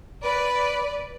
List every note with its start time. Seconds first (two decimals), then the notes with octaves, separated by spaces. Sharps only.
0.23 B4 D5